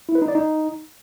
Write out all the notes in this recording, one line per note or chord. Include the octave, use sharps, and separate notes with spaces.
E4
B4
D#4
D5
D#4